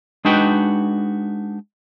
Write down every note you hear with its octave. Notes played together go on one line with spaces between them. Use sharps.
G#3 D4 D#4 F#4 B4 G5